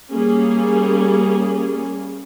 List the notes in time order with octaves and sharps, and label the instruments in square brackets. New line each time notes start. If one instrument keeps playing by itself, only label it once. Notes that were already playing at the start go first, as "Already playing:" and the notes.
[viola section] G3 A#3 C#4 G#4